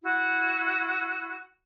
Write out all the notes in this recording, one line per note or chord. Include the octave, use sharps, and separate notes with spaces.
E4 F#4